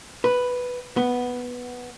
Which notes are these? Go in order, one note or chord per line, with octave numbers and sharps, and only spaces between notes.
B4
B3